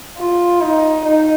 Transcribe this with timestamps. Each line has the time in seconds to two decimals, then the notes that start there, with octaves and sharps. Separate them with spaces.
0.18 F4
0.62 D#4
1.05 D#4